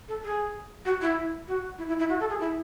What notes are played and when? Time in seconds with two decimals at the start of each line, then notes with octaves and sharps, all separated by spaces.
0.08 A4
0.24 G#4
0.85 F#4
1.01 E4
1.48 F#4
1.78 E4
1.88 E4
1.99 E4
2.09 F#4
2.20 A4
2.30 G#4
2.40 E4